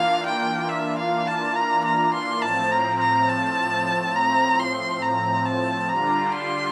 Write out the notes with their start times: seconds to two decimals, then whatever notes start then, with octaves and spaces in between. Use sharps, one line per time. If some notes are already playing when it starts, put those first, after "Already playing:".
Already playing: E3 A#3 D4 F4 F5
0.26 G5
0.69 E5
0.98 F5
1.27 A5
1.56 A#5
1.85 A#5
2.14 C6
2.42 A2 F3 C4 A5
2.71 A#5
3.00 A#5
3.29 A5
4.16 A#5
4.59 C6
5.03 A#5
5.46 A5
5.89 D3 G3 D4 F4 A#5
6.32 C6